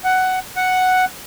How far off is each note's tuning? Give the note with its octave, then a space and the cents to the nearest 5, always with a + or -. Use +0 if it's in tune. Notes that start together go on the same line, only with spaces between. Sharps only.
F#5 +10
F#5 +0